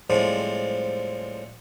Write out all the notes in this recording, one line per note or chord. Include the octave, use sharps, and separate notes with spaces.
A2 F3 G3 G#3 C4